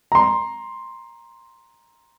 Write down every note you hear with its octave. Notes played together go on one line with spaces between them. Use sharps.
A#5 C6